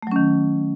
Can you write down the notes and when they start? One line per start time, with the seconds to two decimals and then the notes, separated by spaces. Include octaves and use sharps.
0.03 A3
0.07 F#3
0.11 C#4
0.16 D#3